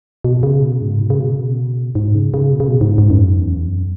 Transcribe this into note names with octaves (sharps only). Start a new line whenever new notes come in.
B2
C#3
B2
G#2
B2
C#3
B2
C#3
B2
G#2
C#3
C#3
B2
C#3
B2
G#2
G#2
F#2
E2
F#2